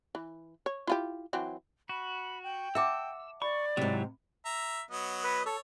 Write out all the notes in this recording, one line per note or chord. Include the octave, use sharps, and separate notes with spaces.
E3
C#5
E4 F4 G4
E3 F#3 C4
F#4 B5
G5
E5 F#5 A5 D6 E6
D5 B5 C#6
G#2 C3 F#3 E4
E5 A#5
F#3 B3 D#5
B4
A4 C#5